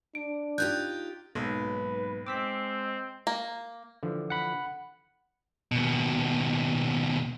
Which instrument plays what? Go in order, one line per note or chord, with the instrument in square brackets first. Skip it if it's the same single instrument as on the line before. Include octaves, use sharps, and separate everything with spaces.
[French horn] D4 [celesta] D7
[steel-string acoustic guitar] D#4 F4 G4 [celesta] F#6 G6
[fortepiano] B1 [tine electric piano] G#2 F#3 A#3 [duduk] B4
[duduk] G#3 [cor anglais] C4 [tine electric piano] D6 E6 B6
[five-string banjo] A#3
[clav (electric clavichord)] D3 E3 F3
[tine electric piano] F#5 B5
[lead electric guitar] D#2 B2